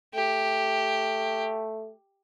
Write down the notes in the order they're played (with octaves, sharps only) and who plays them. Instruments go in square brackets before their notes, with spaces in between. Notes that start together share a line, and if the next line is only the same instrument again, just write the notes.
[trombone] A3 [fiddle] G4